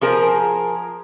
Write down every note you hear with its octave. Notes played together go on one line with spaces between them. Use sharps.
F3 G#4 A#4 C5